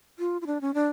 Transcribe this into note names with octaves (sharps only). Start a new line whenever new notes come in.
F4
F4
D4
C#4
D4